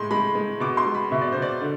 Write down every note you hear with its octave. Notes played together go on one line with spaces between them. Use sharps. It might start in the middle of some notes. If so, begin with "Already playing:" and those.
Already playing: A2 G#3 C6
G#3 B5
G#3
B2 D6
C6
G#3
B5
B2 E5
D5
B2 C5
D5
D3